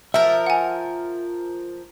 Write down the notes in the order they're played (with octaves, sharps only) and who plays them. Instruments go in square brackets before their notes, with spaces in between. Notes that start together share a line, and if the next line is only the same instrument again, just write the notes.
[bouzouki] F3 A#4 [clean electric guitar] E5
[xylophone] F#5 G#5